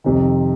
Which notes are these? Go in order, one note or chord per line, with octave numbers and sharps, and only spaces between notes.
F2 C3 D#3